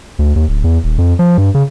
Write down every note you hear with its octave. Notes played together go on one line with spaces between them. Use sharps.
D2
D#2
D1
E2
D#1
F2
F3
G2
C#3